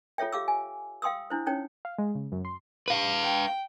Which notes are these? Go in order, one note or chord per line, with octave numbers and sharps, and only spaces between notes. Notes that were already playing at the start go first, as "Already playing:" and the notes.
F4 A4 C#5 E5 G5
G4 F5 D6 E6
G#5
F5 G5 C6 D#6 E6
D4 E4 C5
C#4 D#4 C#5 G5
F5
G#3
C#3
F#2
C6
B4 F5
G5